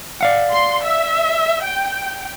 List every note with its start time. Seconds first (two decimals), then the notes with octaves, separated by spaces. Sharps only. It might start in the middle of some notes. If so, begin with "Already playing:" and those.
0.21 D5 F5 F#5
0.51 C6
0.84 E5
1.64 G5